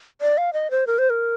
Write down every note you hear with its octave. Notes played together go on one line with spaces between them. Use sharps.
D5
F5
D#5
C5
A#4
C5
A#4